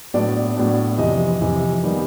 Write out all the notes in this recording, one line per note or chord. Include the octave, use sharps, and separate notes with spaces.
A2 F#3 B3 D4 D5
A2 F#3 B3 D4
F2 C3 E3 D#5
F2 C3 E3
D#3 G3 B3